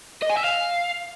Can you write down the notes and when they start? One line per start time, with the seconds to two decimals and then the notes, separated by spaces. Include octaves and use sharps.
0.23 D#5
0.30 G#5
0.37 E5
0.44 F5